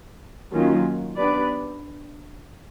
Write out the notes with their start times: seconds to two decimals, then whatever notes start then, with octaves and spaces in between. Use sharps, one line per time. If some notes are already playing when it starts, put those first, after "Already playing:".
0.52 D#3 F#3 A#3 C#4 F4
1.15 B3 D4 G4 B4 D5